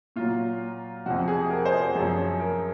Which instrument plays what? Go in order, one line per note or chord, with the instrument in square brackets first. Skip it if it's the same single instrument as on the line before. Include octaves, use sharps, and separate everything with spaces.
[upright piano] A#2 F#3 F4
F2 C3 F3 F#4
G#4
A#4
C5
C5
F#2 F3 G#4
A#4